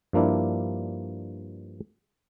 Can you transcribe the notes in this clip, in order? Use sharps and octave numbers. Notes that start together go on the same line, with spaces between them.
G2 F3 A#3 D4 E4